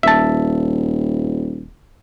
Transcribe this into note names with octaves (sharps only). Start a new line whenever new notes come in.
D#1 E5 A5